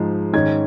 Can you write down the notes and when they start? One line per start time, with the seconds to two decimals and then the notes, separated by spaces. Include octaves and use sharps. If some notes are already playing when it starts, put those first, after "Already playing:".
Already playing: G#2 F3 G#3 D#4
0.33 G#2 D#3 C#4 G#6